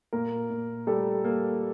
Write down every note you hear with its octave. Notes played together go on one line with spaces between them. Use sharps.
A#2 A#3 A#4
A#2
G3 A3 A4
A#3